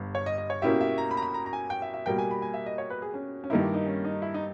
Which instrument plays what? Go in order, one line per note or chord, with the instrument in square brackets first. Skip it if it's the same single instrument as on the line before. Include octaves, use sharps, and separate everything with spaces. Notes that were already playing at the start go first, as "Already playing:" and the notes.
Already playing: [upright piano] G1 G2
[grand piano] C#5
D#5
D#5
C#5
[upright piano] B2 A#3 C#4 E4 G4 [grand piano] E5
[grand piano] E5
A#5
B5
A#5
B5
A#5
A#5
G#5
G5
E5
E5
[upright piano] B2 G3 A#3 [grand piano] G5
[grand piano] G#5
B5
G#5
E5
D#5
C#5
B4
G#4
C#4
C#4
[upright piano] G2 D#3 A#3 E4 [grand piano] D#4
[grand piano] G4
D#4
C#4
D#4
E4
D#4